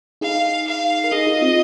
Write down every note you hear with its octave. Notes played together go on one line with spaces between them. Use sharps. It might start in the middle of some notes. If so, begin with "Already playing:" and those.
D#4 G#4 F5
F5
A#4
D#4 G#4 D#5
D#4 G#4
C4 F4